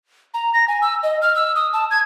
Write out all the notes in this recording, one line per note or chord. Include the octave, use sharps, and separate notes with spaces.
A#5
A#6
G#5
E6
D#5
F6
E6
D#6
A5
G#6